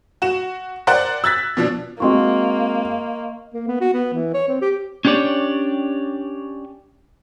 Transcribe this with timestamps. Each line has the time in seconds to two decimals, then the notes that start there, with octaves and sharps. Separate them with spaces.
0.22 F#4 E7
0.87 A#4 C5 D5 F#5 G5 F#6
1.24 E6 F#6 G#6 A6 B6
1.57 B2 F3 D4
2.00 G#3 A#3 C4 F#4 D#5 C6 C#6
3.54 A#3
3.68 B3
3.81 F#4
3.93 B3
4.14 E3
4.34 C#5
4.48 C4
4.61 G4
5.05 C#4 D4 G4 C#5 D5